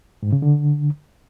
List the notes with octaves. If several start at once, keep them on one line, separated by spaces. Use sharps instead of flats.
G#2
C#3
D3